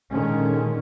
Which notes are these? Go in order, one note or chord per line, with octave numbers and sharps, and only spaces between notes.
A#2 D3 D#3 G#3 C#4